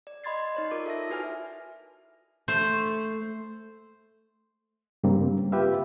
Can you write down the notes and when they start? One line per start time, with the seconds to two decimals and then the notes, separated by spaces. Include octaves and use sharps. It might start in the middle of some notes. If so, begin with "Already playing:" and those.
0.07 D5
0.24 D#5 B5 C6 G#6 A6 C7
0.55 D#4 C#5 D5
0.71 F4 A#4 D6
0.86 A4 E5 A#6
1.10 E4 F#4 B4 G#5 F6
2.48 A3 C5
5.04 G2 C#3 G3 A#3 C4
5.52 F4 G4 B4 E5 F5